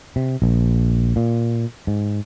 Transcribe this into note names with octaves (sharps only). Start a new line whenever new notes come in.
C3
A#1
A#2
G#2